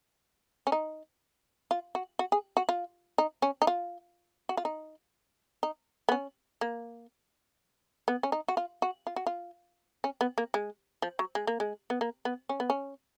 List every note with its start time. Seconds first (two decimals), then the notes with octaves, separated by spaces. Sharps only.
0.67 C#4
0.72 D#4
1.71 F4
1.95 F#4
2.19 F#4
2.32 G#4
2.57 F#4
2.69 F4
3.18 D#4
3.42 C#4
3.62 D#4
3.67 F4
4.49 F#4
4.57 F4
4.65 D#4
5.63 D#4
6.09 B3
6.12 C#4
6.61 A#3
8.08 B3
8.23 C#4
8.32 D#4
8.48 F#4
8.57 F4
8.82 F#4
9.07 F4
9.16 F#4
9.27 F4
10.04 C#4
10.21 B3
10.38 A#3
10.54 G#3
11.02 F3
11.19 F#3
11.35 G#3
11.47 A#3
11.60 G#3
11.90 B3
12.01 A#3
12.25 B3
12.49 C#4
12.60 B3
12.70 C#4